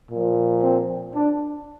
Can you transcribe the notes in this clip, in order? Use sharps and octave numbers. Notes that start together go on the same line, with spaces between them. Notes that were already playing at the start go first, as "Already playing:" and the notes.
A#2 F3
C4
D4